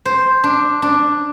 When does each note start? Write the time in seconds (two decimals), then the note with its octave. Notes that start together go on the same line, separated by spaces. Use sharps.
0.05 C5
0.44 D4
0.82 D4